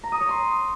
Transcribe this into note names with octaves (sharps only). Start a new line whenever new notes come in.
A#5
D#6
C#5
C6